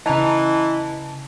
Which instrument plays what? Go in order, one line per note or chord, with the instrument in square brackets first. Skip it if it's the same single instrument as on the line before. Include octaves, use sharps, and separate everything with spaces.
[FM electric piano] C#3 A5 [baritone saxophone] E3 [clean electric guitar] D#5 A#5